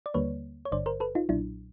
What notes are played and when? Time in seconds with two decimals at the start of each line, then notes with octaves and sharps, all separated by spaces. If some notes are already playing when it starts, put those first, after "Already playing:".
0.06 D5
0.14 D#2 D3 G3 A#3 B4 C#5
0.65 C#5
0.72 G#1 G2 D3 C5 D5
0.86 A#4 C5
1.00 A4 B4
1.15 D#4 F4
1.29 B1 A#2 F#3 D4 E4